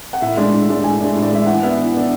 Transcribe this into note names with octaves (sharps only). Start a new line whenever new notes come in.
F#5
A2 E5
G#3 D4
A2
G#3 D4
A2 G#5
G#3 D4
A2
D5
G#3 D4 E5
E3 F#5
B3 D4 E5
E3
B3 D4